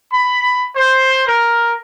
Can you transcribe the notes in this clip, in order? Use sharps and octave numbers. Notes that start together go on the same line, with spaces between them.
B5
C5
A#4